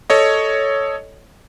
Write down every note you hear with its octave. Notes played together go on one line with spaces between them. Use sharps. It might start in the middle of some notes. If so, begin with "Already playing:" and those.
A4 C#5 D#5